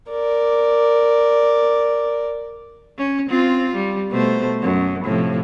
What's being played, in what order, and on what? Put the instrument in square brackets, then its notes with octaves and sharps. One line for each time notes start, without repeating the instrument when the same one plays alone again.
[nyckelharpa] A#4 D5
[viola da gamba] C#4
C4 F4
G3
B2 A3 C5
F#2
A2 C3 F3